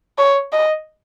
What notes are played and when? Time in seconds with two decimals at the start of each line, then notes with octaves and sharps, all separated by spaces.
0.18 C#5
0.53 D#5